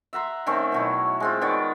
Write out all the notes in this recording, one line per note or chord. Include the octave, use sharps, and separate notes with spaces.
E5 F#5 A#5 C6
D#3 A3 C4 C#4
B2 F#3 E4
G#3 C4 F4
D#3 B3 C#5 D5